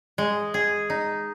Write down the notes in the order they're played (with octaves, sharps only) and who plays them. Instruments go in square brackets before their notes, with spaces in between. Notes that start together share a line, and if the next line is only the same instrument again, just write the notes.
[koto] G#3
G#4
D#4